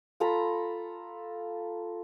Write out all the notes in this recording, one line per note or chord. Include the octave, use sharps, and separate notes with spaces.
F4 A4 A#5 B5